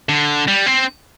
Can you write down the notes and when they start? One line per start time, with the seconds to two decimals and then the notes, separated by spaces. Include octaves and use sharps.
0.09 D3
0.48 G3
0.66 C4